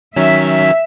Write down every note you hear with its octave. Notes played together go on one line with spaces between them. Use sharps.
D#3 F#3 C#4 E5